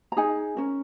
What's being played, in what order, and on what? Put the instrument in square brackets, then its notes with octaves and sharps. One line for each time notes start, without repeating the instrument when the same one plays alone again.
[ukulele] A#5
D#4 G#4 G#5
C#4 A#4